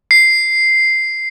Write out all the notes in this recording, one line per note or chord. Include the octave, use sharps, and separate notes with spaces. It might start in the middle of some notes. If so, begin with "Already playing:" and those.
C7